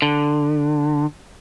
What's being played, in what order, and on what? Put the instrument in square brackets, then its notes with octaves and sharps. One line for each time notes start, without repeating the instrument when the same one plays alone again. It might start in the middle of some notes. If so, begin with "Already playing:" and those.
[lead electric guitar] D3